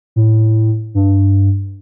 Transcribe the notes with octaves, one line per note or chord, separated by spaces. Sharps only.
A2
G2